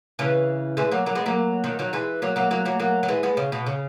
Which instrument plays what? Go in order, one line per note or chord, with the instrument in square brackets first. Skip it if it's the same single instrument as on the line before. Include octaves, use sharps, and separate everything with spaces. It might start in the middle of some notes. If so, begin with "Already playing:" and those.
[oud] C#3 E3
E3 G#3
F#3 A#3
F#3 A#3
G#3 B3
F#3 A#3
D#3 F#3
D#3 F#3
E3 G#3
F#3 A#3
F#3 A#3
F#3 A#3
F#3 A#3
F#3 A#3
F#3
E3 G#3
G#3 B3
C#3
B2
C#3